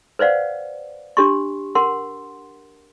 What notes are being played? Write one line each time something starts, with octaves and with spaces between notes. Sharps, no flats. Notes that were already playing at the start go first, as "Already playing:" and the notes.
B4 C5 D5 F5 F#5
D4 G4 C6 C#6
A#4 F#5 C6